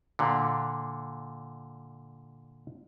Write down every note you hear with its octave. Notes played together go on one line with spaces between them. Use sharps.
A#2 D3